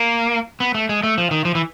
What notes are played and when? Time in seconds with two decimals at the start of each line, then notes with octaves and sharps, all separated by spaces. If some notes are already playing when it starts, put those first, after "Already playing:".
Already playing: A#3
0.60 B3
0.74 A3
0.89 G#3
1.03 A3
1.18 F3
1.31 D#3
1.45 F3
1.55 E3